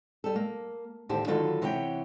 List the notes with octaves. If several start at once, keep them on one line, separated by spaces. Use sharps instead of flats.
G3 G4 A4
A#3
D#2 A2 D3 G4 C5 A5
D3 D#3 F#3 F4 A4 B4
C3 E3 B3 C#5 F5 G5